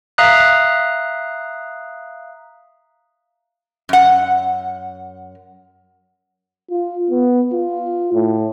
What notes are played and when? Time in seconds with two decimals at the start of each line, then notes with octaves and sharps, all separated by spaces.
0.18 E5 F5 A#5 D#6 F#6
3.89 F#2 F#5
6.71 F4
7.10 B3
7.53 F4
8.14 A2